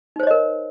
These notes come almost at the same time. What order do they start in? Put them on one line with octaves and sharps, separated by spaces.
D#4 C5 C#5 D#5 A#4